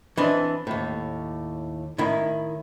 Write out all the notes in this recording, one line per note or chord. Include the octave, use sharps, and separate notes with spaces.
E3 C4 D4 D#5
D#2 A2
A2 D#3 E4